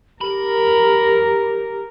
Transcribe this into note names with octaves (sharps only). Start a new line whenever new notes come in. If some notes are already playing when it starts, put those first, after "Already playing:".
G4 A#4 B5